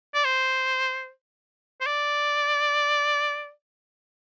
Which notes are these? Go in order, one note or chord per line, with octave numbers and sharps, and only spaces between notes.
D5
C5
C5
D5